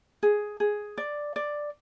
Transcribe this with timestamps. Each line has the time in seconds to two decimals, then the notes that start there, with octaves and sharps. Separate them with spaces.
0.23 G#4
0.60 G#4
0.98 D5
1.36 D5